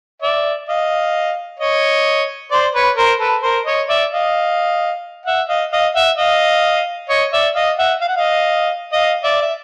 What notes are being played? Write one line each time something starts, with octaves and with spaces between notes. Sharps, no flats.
D5 E5
D#5 F5
C#5 D#5
C5 D5
B4 C#5
A#4 C5
A4 B4
A#4 C5
C#5 D#5
D5 E5
D#5 F5
E5 F#5
D#5 F5
D#5 F5
E5 F#5
D#5 F5
C#5 D#5
D5 E5
D#5 F5
E5 F#5
F5
F#5
D#5 F5
D#5 F5
D5 E5
E5